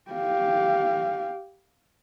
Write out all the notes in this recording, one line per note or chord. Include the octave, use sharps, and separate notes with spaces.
G4 F5